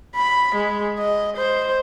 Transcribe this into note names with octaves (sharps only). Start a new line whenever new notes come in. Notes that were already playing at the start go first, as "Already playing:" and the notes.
B5
G#3
D#5
C5